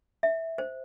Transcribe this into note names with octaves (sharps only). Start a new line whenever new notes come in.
E5
C5